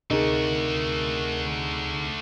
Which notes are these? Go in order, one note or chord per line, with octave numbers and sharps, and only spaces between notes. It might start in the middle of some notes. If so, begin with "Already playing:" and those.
D2 C3 A3 D#4 F#4 G#4 A#4